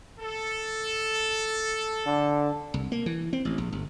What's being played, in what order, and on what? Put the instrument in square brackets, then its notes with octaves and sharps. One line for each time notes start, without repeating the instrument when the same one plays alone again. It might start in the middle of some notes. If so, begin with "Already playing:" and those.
[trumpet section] A4
[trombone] D3
[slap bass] C2
A#3
E3
C4
A1
A#1
G1